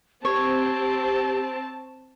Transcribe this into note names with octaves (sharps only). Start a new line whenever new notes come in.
C4 G4 C#5 A5